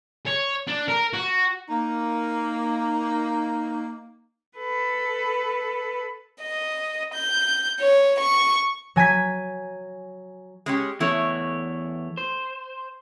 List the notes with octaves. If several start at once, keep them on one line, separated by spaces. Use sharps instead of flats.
C#5
D4
A#4
F#4
A#3 D#4
A4 B4
D#5
G6
C#5
C#6
F#3 G#5 G#6 B6
G#3 C#4 G4
E2 A3 E4 C#5
C5